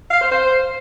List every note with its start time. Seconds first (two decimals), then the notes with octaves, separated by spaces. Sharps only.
0.10 F5
0.20 C5
0.31 C5